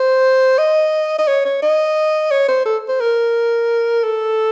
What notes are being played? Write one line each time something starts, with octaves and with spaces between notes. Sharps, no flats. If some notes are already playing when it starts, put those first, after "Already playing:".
Already playing: C5
D#5
D#5
C#5
C#5
D#5
C#5
C5
A4
C5
A#4
A4